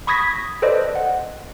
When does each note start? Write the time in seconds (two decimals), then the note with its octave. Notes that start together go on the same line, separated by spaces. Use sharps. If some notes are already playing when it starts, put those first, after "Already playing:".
0.07 B5 C#6 D#6 G#6 A#6 B6
0.62 A4 B4 C5 D5 D#5
0.95 F#5